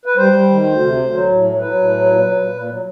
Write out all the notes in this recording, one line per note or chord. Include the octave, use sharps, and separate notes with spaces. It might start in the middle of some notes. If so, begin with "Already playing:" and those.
B4
G3 C5
G3
D#3
D2
C3
D2
F#3
A2
F#3
F#3 B4
A2
F#3
A#2
F#3
A#2
A#2
F#3